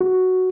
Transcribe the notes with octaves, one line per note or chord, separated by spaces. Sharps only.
F#4